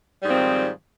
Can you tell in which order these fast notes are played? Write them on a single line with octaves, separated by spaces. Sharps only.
G3 G#2 F3 C4 D#3